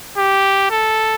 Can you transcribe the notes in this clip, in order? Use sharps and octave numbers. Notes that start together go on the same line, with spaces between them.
G4
A4